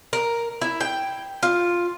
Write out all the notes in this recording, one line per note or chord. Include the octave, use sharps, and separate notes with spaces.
A#4
E4
G5
F4